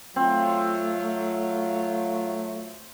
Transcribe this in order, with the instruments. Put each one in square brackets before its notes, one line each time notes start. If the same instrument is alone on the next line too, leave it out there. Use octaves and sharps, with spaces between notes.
[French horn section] F#3 F4 [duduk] A3 [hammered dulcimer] C4